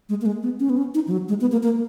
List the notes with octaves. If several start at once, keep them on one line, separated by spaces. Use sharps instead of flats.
G#3
A#3
G#3
B3
C#4
B3
C#4
D#4
F3
F#3
G#3
B3
A#3
A#3